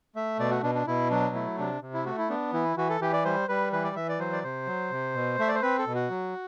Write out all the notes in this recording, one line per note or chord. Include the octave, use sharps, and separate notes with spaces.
A3 E5
B2 D5
F#4
B2 D4
D4
B2 E4
F#3 D4
A3 E4
C3 D4
C3
E4
A3 F#4
E4
B3 D4
E3 E4
E3 F#4
A4
E3 G4
D5
G3 C5
G3 B4
E3 B4
D5
E3 E5
D5
F#3 C5
D5
C3 C5
F#3
C3
B2
A3 E5
D5
C5
C4 B4
A4
B2
F#4
F#3